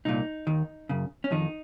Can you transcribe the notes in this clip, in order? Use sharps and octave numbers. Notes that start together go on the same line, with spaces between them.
C2 A#2 D#4
D#2 D#3
F#2 C#3
C#4
F2 D#3 D#4